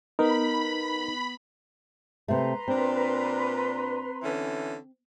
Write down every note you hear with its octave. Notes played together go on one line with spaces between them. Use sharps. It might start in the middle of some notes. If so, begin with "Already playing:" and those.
B3 D#4 A#4 B4 B5
C3 A3 B4 A#5 C6
A#2 C4 D4
D3 E3 C#4